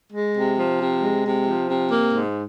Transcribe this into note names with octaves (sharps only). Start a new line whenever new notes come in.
G#3
C3
F3
C3
G#3
C3
F3
C3
A#3
G#2